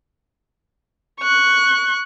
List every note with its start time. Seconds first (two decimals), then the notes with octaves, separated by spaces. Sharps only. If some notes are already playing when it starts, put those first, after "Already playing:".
1.21 C#6 F#6